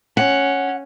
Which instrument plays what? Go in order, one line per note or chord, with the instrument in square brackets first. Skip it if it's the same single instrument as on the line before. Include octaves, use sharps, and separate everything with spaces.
[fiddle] C#4 [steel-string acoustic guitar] F#5